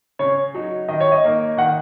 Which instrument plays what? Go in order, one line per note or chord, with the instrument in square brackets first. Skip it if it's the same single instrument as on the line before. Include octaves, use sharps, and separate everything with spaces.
[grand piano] C#3 [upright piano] C#5
[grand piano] F#3 D#4
[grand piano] D#3 [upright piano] D#5
[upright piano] C#5
D#5
[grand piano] A#3 D#4 A#4
[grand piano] D#3 [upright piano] F#5